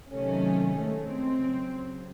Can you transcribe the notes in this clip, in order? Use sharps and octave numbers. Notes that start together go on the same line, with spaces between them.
C3 D#3 F#3 A3 C#4
A2 G#3 A3
C4
C#3 F#3